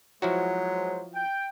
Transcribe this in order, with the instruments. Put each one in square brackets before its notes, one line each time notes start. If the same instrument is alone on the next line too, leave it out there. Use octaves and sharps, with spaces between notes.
[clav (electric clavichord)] F3 E4 F#4 [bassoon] F#3 [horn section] G#3 C5
[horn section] G5